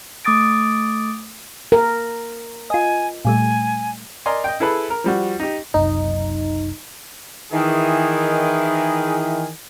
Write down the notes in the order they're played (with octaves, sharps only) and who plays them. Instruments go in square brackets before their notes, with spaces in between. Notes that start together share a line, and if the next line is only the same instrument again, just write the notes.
[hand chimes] A3 D6 D#6 A6 D7
[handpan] A#4
[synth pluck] F4 D#5 [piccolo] G#5
[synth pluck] A#2 G3 A3 [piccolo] G#5
[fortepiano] A#4 D5 D#5 G#5 C6
D#5 G5
E4 G#4 A4 B4 B5
A#4
F3 G3 F#4
D#4 G4
[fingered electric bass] F#1 C2 F#2 [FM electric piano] D#4
[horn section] D#3 E3 G#4